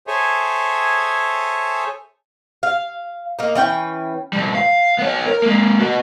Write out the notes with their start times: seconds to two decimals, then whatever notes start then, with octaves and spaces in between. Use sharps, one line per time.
0.07 G#4 A4 C5 C#5 E5 G#5
2.63 F5
3.39 A#3 D#4
3.55 E3 C#4 G5
4.33 B2 G3
4.55 F5
4.99 B3 C#5
5.26 A#4
5.42 G#3 A#3
5.80 B3 F#4